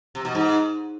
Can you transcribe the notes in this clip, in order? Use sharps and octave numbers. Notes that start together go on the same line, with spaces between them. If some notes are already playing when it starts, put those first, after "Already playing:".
C3
B2
G#2